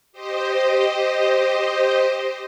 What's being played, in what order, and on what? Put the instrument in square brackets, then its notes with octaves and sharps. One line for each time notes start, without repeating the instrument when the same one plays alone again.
[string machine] G4 C5 D#5